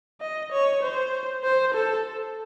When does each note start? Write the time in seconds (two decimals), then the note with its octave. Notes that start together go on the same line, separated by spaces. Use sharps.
0.21 D#5
0.52 C#5
0.83 C5
1.44 C5
1.74 A4